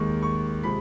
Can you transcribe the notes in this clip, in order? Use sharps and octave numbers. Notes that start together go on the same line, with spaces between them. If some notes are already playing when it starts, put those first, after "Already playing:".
Already playing: D#2 D#3 G#3 C#6
C#6
C3 F3 G#3 B5